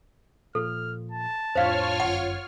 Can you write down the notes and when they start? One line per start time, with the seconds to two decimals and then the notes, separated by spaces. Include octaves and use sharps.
0.55 A#2 F3 F4 A4 F6
1.12 A5
1.55 F2 A2 D4 F4 C5 C#5 F5 F6
2.00 G1 F#2 F#5